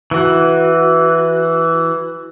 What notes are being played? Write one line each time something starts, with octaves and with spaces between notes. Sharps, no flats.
E3 F#4